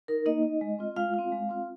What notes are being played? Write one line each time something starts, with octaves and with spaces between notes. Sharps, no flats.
D#4 A#4
A#3 D#4 D#5
D#4
G#3
C4 F4
G#3 F4 F5
C4 F4
G#3
C4 F4